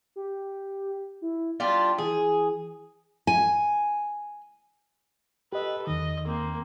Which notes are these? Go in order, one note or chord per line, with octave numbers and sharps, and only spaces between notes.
G4
E4
G3 D4 F4 A6
E3 G#4
G#5
G4 A4 B4 D#5
E2 D#3 D#5
A#3 C4